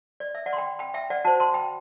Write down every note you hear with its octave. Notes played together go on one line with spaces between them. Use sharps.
D5
E5
D5 F#5
C6
G5 B5
G5 B5
E5 G5
D5 F#5
F#4 C5 F#5 A5
A5 C6
G5 B5